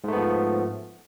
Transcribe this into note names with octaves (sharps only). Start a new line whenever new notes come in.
G#2 F3 A3 B3